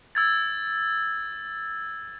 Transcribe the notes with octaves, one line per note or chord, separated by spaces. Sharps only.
E6 G#6 A6